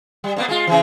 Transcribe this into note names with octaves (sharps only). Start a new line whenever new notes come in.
G3
G#2 A#3 B3
G#3 F4
C#3 E3